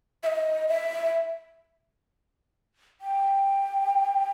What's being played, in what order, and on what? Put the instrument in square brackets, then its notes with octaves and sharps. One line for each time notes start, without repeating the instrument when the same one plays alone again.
[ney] E5
D#5
E5
G5